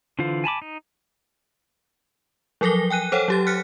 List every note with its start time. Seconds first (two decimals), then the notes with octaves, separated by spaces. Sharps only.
0.19 D3 E3 F4 C5 F5
0.44 G#5 A5 B5 D6
0.62 D#4
2.61 F3 F#3 A4 A#4 A#6 G7
2.90 G5 G#5 F#6 D#7
3.12 A4 C5 C#5 F#5 G5
3.28 F#3 G4 A6
3.47 F6 F#6 B6 C#7